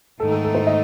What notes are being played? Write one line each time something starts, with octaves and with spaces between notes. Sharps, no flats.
G#2 D#3 A3 D#4 A4
A4
A4
C5
D#5